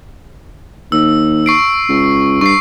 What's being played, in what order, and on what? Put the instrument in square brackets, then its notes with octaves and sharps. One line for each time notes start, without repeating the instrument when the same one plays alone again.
[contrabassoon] D#2 [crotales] E6
[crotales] C#6 C7 D7
[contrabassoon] C#2
[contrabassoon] G2 [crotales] C#6 C7